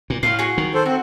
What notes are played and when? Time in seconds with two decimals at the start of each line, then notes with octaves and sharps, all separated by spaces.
0.10 A#2
0.23 A2 F5 C6 F6
0.39 F#4 G#4
0.58 D#3
0.74 A4 C5
0.86 C4 F#4